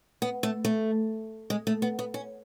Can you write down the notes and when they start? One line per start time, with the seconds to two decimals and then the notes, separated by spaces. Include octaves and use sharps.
0.22 B3
0.43 A3
0.65 A3
1.50 G#3
1.67 A3
1.82 B3
1.99 B3
2.14 C#4